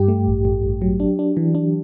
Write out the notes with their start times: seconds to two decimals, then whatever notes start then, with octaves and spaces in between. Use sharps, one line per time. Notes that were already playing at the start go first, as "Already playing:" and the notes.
Already playing: G2 G4
0.08 A3
0.28 A1
0.45 A1
0.63 A1
0.82 F#3
1.00 D4
1.19 D4
1.37 E3
1.55 D4